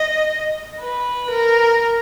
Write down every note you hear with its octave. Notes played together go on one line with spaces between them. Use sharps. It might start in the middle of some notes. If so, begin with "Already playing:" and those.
Already playing: D#5
B4
A#4